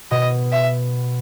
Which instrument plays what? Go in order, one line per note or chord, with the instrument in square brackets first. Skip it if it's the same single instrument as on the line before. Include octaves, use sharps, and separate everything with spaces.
[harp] B2 [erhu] D#5
[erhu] E5